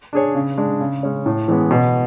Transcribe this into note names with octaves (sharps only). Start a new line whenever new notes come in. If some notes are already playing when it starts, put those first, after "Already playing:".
D4 G#4 C#5
C#3
G#3 D4
C#3
G#3 C#4
A2
E3 G#3 B3
B2